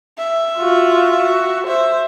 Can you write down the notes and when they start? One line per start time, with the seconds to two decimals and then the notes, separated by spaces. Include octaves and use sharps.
0.18 E5
0.58 F4 F#4
1.22 F#4
1.68 C5 E5